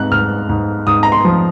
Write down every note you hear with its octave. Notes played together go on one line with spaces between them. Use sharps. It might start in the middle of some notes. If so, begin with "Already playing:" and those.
Already playing: G#2 C4 F#6
G#2 F6
G#2
G#2 D#6
A#5
C6
F3